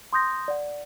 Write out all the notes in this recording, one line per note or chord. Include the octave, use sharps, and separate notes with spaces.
C6 D#6 G6 A#6
D5 F#5